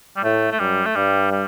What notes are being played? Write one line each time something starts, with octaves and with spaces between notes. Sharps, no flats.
G3
A2 A3
A3
F#2 G3
A3
G2 G3
G3